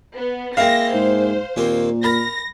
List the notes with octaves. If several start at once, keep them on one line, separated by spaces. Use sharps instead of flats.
B3
G#3 A#3 E4 F5 G5 A#6
G#2 C5
D#2 A#2 A#3 C4
A#4 B5 A#6